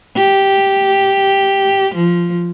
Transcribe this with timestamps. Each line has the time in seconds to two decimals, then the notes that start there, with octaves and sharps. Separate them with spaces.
0.16 G4
1.95 F3